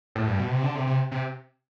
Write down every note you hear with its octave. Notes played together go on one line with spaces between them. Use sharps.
A2
G2
B2
C3
D3
C3
C3
C3